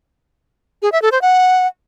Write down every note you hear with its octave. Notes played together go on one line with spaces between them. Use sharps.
G#4
E5
A4
C5
F#5